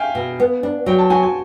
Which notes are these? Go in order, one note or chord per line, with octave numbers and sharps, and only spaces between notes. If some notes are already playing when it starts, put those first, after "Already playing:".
Already playing: E5 F5 G5 G#5
B2
B3
D4
F#3 G5
A5
F#4 G#5
G#5